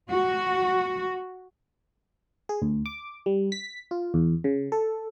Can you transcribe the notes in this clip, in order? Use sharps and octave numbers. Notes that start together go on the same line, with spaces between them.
F#4
G#4
D2
D6
G3
B6
F4
E2
C#3
A4